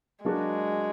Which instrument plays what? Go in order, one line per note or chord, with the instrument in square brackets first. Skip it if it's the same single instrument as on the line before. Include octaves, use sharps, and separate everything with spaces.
[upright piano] F#3 A#3 D4 F#4 [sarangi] G#3